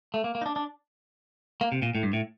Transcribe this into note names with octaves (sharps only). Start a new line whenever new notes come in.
A3
A#3
A#3
D#4
D4
D4
A#3
C3
A#2
A2
G2
A2